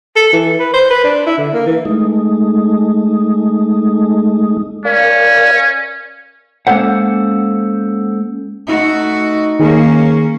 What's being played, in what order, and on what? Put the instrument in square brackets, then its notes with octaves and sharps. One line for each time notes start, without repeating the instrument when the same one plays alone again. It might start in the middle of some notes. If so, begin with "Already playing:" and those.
[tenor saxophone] A4
E3
B4
C5
B4
D4
E4
D3
A#3
E3
[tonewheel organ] G#3 A3 D#4
[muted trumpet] C#4 [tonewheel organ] A#4 D5 F5
[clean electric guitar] G#3 A#3 C#4 A4 C5 F#5
[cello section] A3 F#4 [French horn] D#4
[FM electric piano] D#3 G#4 [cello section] A#3 C#4